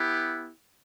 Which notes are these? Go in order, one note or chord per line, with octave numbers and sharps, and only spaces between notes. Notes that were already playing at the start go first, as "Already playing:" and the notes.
Already playing: B3 E4 G4